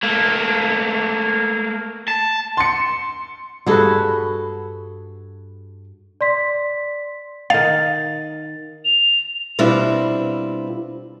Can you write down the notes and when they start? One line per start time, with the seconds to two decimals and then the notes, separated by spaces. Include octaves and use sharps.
0.03 A3 A#3
2.08 A5
2.57 C6 C#7
3.66 G2 F#4 G#4 A4 B4
6.21 D5 C6 B6
7.50 D#3 D#4 F5 A6
8.85 F7
9.59 B2 G3 C4 D4 E4 F4